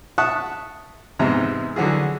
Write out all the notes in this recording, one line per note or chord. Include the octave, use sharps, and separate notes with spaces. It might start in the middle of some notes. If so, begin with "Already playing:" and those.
E5 F#5 A5 C#6 D#6 F#6
E2 G#2 C3 G#3 E5 A#5
D3 E3 F#3 F#4 G#4